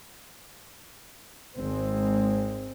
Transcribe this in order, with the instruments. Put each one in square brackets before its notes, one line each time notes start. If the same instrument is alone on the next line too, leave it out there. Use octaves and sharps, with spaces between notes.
[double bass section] G#1 G#3 C4